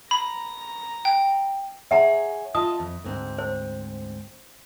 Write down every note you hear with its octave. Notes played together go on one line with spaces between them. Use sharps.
A#5 B5
G5
G#4 C#5 E5 F#5 A#5
F4 D#5 A5 D#6
F2
D2 G#2 C4
C5